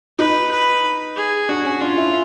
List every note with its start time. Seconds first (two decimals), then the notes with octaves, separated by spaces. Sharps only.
0.19 D#4 B4
0.52 B4
1.16 G#4
1.49 D4 F#4
1.65 C#4
1.81 D4 F4
1.97 E4